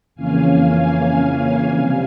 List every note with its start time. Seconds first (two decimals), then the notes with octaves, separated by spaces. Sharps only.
0.15 F2 C#3 E3 A#3 C#4 F5 G#5
1.72 F2 C3 G3 F5 G#5